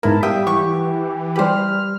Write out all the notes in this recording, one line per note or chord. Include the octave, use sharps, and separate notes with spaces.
G#2 B3 E4 A#4 A5
G3 G4 E5 F5 G5 D#6
E3 F#5 C#6 D6
G3 G4 B4 C5 B5 F6